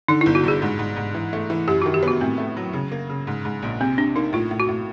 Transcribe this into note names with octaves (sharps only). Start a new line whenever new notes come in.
D3 D#4
G1 E4
F#4
G2 G#4
G#2
G#2
G#2
E3
A3
E3
F#2 G4
D#3 F#4
G4
B3
F#4
A2 C4
A3
F#3
C#3
A#3
C#3
G#2
G#2
A#1
C3 C4
C3 D4
A#3 D#4
A2 F4
A2
F#4
A2